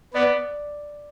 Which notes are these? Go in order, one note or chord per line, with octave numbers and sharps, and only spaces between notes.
B3 D5